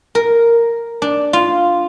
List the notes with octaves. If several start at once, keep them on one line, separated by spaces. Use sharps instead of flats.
A#4
D4
F4